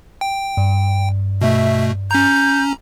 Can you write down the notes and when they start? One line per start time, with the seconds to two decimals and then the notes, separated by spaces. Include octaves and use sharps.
0.21 G5
0.57 G2
1.42 B2 A3 E5
2.11 C#4 A#5 G6